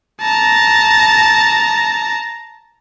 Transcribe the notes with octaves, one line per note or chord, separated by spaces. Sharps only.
A5 A#5